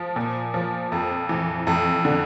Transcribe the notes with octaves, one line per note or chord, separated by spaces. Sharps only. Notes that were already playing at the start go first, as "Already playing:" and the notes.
Already playing: F3
A#2
F3
F2
E3
F2
D3